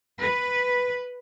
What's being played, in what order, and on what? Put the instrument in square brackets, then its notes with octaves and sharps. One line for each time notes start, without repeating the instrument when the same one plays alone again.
[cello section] B4